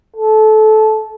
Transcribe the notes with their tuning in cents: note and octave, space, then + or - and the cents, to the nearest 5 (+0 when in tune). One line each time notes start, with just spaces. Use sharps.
A4 -20